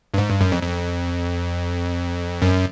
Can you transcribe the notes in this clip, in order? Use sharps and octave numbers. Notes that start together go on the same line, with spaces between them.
G2
G#2
G2
F#2
F2
F2
F#2